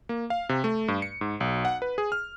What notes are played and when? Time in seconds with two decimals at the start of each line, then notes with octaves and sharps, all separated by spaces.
0.09 A#3
0.30 F5
0.49 C3
0.64 A3
0.88 G2
1.02 C#7
1.21 G#2
1.41 B1
1.65 F#5
1.82 B4
1.98 G#4
2.12 F6